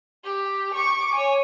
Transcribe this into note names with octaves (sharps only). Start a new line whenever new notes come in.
G4
C#6 D6
C#5 G#5